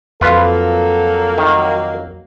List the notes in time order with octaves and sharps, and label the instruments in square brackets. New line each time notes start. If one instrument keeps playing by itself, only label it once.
[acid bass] F2 [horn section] F#3 A#3 [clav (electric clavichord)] F4 B4 [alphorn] A4
[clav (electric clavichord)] D#3